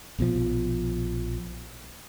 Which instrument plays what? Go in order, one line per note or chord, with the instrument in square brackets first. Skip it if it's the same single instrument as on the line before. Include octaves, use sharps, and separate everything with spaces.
[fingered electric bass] A#1 B2 D3 F3